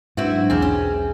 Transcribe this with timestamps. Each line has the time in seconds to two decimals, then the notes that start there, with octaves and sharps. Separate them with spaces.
0.17 G#2 F#3 C4 D4 E4 F#4 B4
0.50 B1 E2 A#2 C4 G#4 G#5
0.62 C#4